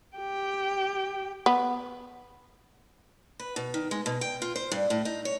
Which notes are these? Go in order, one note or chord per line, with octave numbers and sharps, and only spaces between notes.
G4 G5
B3
B4
B2
D#3
G#3
B2
G5
F4
C5
G2
A2
D#4
C#5